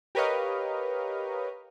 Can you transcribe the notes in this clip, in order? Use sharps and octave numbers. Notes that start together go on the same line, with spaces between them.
G4 A#4 B4 C#5 D#5 F5